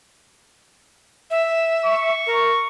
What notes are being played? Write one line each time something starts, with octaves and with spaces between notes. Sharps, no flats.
E5
C#6
A#4